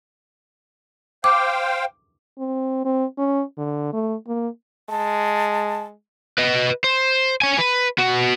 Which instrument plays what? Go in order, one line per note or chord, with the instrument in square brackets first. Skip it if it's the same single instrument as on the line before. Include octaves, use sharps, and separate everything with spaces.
[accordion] C5 F5 G5 [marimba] D6
[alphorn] C4
C4
C#4
D3
A3
A#3
[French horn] G#3 [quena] A5
[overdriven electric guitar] B4 D#5
C5
C#5 G#5
B4
B3 F#4